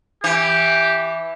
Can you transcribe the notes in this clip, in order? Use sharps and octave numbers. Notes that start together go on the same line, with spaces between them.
E3 G4